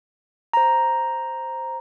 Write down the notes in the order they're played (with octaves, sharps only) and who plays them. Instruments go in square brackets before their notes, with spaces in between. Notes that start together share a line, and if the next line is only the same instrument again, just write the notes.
[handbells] C5 A#5